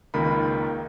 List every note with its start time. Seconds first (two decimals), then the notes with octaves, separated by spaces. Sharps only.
0.14 C#2 D#3 A#3 D#4 B5